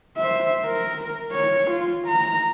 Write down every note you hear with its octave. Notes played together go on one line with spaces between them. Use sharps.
C5 E5
A#4
C#5
F4
A#5